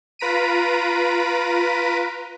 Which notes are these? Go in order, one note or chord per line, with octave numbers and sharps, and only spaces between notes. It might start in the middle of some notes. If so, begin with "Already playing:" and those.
F4 B4 A#5 B6 D7 D#7